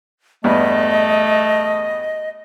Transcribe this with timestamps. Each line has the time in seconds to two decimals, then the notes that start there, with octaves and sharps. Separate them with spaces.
0.44 E2 G2 A3 B3 D#5